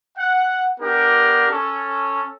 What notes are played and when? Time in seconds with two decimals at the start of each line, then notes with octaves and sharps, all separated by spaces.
0.17 F#5
0.80 B3 D4 G4 A#4
1.49 C#4 A4